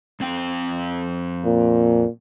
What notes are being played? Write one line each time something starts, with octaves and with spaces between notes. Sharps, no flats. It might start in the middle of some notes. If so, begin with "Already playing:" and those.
F2 C4 G5
A#2